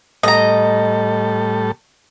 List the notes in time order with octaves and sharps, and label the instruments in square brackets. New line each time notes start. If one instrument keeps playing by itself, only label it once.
[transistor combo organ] A2 G3 A4 [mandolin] D#5 A#5